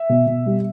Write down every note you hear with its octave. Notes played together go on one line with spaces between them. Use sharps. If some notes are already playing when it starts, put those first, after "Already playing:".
Already playing: E5
B2
B2
G3